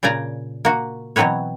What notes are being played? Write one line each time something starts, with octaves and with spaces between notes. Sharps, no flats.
A#2 C#3 D5 G#5 A#5
A#3 F#4
B2 E3 F#3 C4 B4 C#5